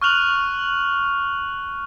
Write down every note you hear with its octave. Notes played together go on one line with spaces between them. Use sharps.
C#6 F6 F#6 F7 F#7